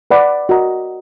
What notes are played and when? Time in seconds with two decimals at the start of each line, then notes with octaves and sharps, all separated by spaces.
0.11 B4 D5 F#5 B5
0.49 F#4 A#4 D#5 A#5